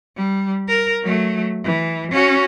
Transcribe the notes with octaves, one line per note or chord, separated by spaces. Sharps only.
G3
A#4
F#3 A3
E3
C#4 F#4